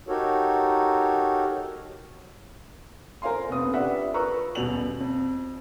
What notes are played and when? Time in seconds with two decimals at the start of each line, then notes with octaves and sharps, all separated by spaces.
0.08 D#4 F#4 G4 A4 A#4 C#5
3.22 A#4 C5 F5 G#5 C6
3.49 F1 B3 C#4 D#6
3.73 D4 F4 G4 B4 E5 F#5
4.13 F4 A#4 B4 A#5 C#6 E6
4.55 D#1 B2 F7 F#7
5.00 F2